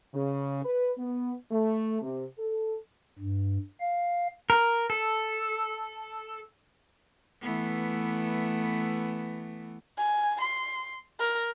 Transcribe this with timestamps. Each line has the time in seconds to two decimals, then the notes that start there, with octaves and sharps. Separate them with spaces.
0.15 C#3
0.65 B4
0.97 B3
1.51 A3
2.02 C3
2.38 A4
3.19 G2
3.80 F5
4.50 A#4
4.90 A4
7.41 E3 A3 B3
9.98 G#5
10.41 C6
11.19 A#4